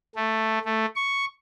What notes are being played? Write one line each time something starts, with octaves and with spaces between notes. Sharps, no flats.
A3
A3
C#6